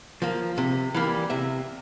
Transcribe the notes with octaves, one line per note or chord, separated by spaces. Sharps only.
F3 A#3
C3
E3 G3 A#3
C3 E5